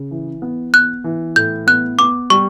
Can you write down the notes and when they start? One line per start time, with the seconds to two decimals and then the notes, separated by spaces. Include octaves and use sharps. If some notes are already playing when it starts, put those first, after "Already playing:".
Already playing: C#3
0.11 E3
0.42 B3
0.73 B3 F#6
1.04 E3
1.36 A2 G6
1.67 B3 F#6
1.98 B3 D6
2.30 G3 C#6